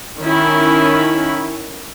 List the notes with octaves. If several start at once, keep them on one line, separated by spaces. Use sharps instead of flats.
D#3 C#4 E4